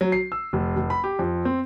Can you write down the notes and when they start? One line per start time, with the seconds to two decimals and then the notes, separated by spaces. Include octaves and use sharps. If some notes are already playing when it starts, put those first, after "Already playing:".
0.01 F#3
0.12 C7
0.32 E6
0.53 F1
0.76 F1
0.90 B5
1.04 G4
1.19 F2
1.45 C4